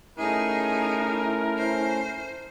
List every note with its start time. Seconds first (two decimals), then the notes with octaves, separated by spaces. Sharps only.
0.18 A3 C#4 D#4 E4 G#4 A#4
1.58 C5